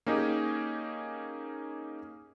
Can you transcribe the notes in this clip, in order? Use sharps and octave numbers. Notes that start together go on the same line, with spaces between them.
A#3 C#4 D#4 G4 G#4